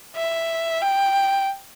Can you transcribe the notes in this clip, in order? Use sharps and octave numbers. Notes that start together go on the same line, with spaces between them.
E5
G5